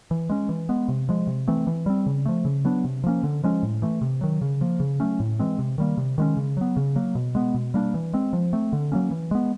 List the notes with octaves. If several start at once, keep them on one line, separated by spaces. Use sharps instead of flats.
E3
G#3 C#4
E3
G#3 B3
C3
F3 G#3
C3
E3 A3 C4
E3
G3 C4
C#3
F3 A3
C#3
F#3 B3 D4
C3
F3 A#3 C#4
D3
F3 G#3 C#4
A2
E3 A3
C3
D#3 F#3
C#3
F3 A#3
C#3
F#3 A3 C#4
A2
E3 G#3 C4
C3
D#3 G3 A#3
C3
D#3 G#3 C#4
C#3
F#3 B3
C#3
F#3 A#3
B2
G#3 B3
B2
G3 A#3 D4
E3
G#3 C4
F3
A3 C4
D3
F#3 A#3 C#4
E3
G#3 B3